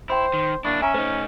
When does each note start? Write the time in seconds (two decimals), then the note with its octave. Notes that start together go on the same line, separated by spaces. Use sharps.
0.10 E4 C5 G5 C6
0.33 D#3
0.65 A#3 D4 E4 C#6
0.82 C#4 E5 G#5 A#5
0.94 A3 D#4 C5